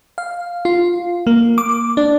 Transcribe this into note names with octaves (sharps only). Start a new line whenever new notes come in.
F5
F4
A#3
D6
D4